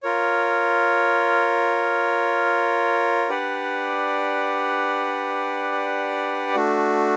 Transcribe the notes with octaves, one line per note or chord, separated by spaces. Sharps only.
F4 A#4 C#5
D4 G4 B4 D5 F#5
A3 D4 F#4